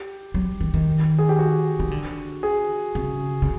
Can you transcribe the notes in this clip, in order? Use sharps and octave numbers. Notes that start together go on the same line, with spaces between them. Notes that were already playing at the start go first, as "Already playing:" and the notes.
Already playing: G4
F#3
D#3
D#3
G#4
G4
F#4
D#3
D3
G#4
C#3
C#3